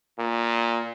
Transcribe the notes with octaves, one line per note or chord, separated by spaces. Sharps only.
A#2